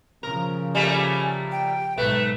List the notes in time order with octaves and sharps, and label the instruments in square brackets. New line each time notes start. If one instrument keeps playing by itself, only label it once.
[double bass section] C#3 F3 [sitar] A#4
[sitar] G3 A3 A#3 [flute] G#5
[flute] G5
[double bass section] B1 G#2 [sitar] A3 [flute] B4